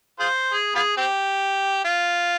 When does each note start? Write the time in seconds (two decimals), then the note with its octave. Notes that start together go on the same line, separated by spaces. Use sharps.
0.20 F4 G#4 C5
0.53 G#4
0.75 B3 F4 G#4
0.97 C4 G4
1.84 F4